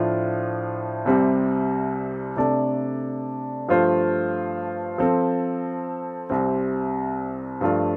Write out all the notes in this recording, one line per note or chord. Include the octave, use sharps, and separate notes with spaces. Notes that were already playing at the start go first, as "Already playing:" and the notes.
Already playing: A2 F3 D4 F4
C2 C3 G3 C4
C3 A3 D4 A4 D5
G2 F3 A3 F4 C5
F3 C4 A4
C2 C3 G3 C4
G2 F3 A3 F4 D5